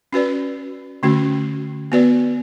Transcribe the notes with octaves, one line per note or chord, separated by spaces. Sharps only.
C#4 F#4 B4 D5
D3 A3 C#4 F#4
B3 F#4 B4 D5